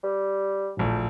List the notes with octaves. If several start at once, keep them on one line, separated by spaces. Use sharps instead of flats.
G3
D1 A#1 A3